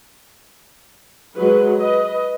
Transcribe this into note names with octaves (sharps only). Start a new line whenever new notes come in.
F#3 G#3 F#4 B4
B4 D#5